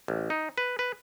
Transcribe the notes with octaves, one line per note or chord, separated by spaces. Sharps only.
A1
D#4
B4
B4